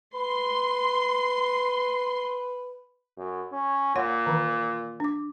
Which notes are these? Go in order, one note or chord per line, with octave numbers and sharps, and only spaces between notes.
B4 C6
F#2
C#4
A#2 C#5 F#5 C6
D#3 E3
D4 D6